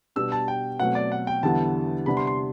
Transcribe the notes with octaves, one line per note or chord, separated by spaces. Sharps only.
B2 G3 D4 E6
A5
G5
B2 F#3 A3 C4 F#5
D5
F#5
G5
E2 D3 G3 B3 E4 A5
C3 G3 B3 D4 B5
C6
C6